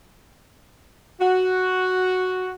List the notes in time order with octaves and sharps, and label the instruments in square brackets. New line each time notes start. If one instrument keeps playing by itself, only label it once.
[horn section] F#4